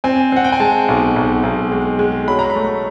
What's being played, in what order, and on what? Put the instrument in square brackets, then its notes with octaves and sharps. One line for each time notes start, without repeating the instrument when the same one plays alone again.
[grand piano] C4 G#5
C4 F#5
G5
G#5
G#3 A5
B1
B1
B1
G#3
G#3
F#3 B5
A#5
B5
A3